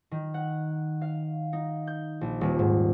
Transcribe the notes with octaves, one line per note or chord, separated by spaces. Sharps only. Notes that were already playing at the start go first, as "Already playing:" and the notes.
D#3
F#5
F5
D#4
G6
A#1
D#1
G#2